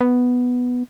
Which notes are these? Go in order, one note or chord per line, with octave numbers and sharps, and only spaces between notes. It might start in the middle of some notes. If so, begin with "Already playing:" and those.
B3